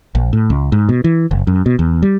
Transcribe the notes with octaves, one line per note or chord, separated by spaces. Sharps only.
A#1
A2
C#2
G#2
B2
E3
F#1
F#2
B2
E2
G3